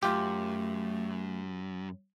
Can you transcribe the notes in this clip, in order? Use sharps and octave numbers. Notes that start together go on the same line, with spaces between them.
F#2 A3 F4 G4